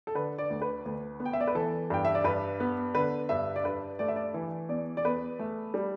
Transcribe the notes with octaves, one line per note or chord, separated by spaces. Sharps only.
A4
D3 B4
D5
D2
B4
D2
B3
G5
E5
D5
B4
E3 A4
G2 G5
E5
D5
G2 B4
B3
D3 B4
G2 E5
D5
G2 B4
A3 D5
E5
D5
E3
E2 D5
D5
E2 B4
A3
G3